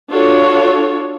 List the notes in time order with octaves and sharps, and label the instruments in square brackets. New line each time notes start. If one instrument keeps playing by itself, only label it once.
[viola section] D4 F4 F#4 A4 C#5